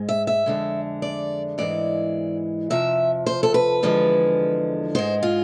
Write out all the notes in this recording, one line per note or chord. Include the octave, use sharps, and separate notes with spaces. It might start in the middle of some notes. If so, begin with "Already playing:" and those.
Already playing: G#2 G#3
E5
E5
F2 D3 G#3
D5
G#2 E3 G#3 D5
F2 C3 F3 E5
C5
A4
B4
E2 D3 F3 G#3
G#2 G#3 C5
F4